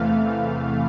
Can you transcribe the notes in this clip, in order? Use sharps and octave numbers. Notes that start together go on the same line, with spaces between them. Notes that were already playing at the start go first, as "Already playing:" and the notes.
Already playing: E2 C3 E3 A3 F5